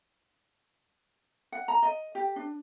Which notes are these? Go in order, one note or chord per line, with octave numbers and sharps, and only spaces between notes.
F#5
A#5
D#5
G4
D4